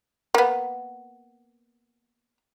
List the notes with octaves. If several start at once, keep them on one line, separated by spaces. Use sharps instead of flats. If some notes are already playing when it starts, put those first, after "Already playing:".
A#3 B3